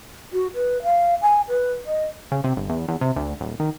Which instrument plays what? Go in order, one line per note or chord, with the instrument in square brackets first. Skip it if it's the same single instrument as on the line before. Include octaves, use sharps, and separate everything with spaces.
[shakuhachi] F#4
B4
F5
G#5
B4
D#5
[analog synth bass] C#3
C3
G1
E2
E2
C3
D2
D#1
D#3